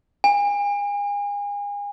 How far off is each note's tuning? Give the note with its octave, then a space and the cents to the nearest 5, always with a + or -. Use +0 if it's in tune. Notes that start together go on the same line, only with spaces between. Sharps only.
G#5 -35